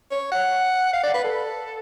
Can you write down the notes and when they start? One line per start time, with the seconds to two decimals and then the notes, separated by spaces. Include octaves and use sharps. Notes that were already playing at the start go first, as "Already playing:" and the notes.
0.11 C#5
0.32 F#5
0.93 F5
1.03 D5
1.14 B4
1.24 A4